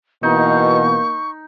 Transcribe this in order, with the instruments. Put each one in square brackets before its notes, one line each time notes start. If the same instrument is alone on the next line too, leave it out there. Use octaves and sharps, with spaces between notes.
[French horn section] B2 E3 [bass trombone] A#3 [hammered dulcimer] D#4 [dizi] C#6